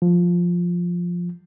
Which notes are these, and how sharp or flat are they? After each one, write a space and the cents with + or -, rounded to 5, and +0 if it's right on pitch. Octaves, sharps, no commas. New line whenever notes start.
F3 +5